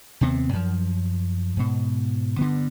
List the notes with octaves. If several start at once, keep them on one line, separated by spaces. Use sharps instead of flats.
D#2 C3 B3 C4
F#2 F3
G#2 B2
G2 D3 B3